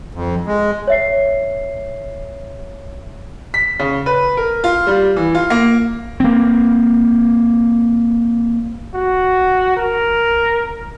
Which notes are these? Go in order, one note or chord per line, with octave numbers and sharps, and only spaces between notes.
F2
G#3
C#5 E5 C7
B6
C#3
B4
A#4
F4
G3
E3
F4
A#3
A#3 C4
F#4
A#4